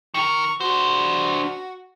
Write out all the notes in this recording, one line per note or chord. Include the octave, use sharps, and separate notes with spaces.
D#3 A#4 C#6
D4 F#4 C5